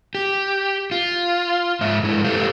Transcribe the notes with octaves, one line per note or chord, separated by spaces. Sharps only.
G4
F4
G#2 E5
G2 G#3 E4
G4 A4 B4 C5 F5